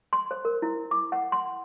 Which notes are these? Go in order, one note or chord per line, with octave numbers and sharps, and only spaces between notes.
C6
C5
A#4
E4
D6
F#5
C6